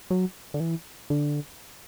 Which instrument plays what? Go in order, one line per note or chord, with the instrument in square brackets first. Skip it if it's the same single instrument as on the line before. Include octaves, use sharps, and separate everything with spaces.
[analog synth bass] F#3
D3
E3
D3